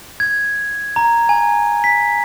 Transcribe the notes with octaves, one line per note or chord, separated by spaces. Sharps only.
G#6
A#5
G#5
B6